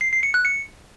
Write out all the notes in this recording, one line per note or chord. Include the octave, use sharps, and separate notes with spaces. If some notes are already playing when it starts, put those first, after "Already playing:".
C7
C7
C#7
F#6
C#7